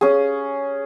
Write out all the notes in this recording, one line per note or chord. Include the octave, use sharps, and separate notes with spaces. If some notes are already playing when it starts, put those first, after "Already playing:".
C#4 G#4